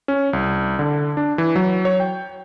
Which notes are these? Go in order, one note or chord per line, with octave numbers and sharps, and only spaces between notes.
C#4
C2
D3
D4
E3
F#3
C#5
G5